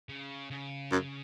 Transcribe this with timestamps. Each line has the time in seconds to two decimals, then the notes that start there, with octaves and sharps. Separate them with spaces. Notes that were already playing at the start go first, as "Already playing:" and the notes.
0.09 C#3
0.50 C#3
0.92 F#2